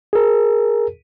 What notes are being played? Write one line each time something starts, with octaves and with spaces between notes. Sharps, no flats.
G#4 A#4